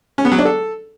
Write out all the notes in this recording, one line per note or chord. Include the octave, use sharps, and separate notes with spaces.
C#4
B3
F#3
D4
A4